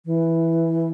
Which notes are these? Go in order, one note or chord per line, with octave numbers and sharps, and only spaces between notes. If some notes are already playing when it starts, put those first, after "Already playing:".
E3